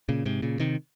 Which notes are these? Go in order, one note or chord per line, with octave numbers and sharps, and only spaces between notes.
A#2 C#3
G#2 C3
A#2 C#3
C3 D#3